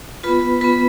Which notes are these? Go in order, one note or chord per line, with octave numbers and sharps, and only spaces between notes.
B3 F4 B4 B5
B3 F4 B4 B5